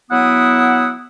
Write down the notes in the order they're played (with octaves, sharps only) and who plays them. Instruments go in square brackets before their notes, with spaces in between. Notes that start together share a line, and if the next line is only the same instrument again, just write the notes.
[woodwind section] F#3 B3 E4 F#5 D#6